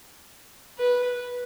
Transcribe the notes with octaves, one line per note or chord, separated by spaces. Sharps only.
B4